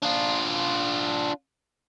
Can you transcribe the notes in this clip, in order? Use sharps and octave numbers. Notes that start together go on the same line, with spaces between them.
D4 F4